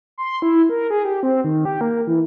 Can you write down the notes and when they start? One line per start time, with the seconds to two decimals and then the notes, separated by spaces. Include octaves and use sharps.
0.18 C6
0.42 E4
0.69 A#4
0.90 G#4
1.05 G4
1.23 C4
1.44 D#3
1.65 G4
1.81 A#3
2.07 E3